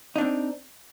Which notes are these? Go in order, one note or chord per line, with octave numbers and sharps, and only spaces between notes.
C4 D4 D#4